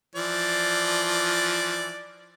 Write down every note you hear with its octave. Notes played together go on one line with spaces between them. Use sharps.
E3 F3 D5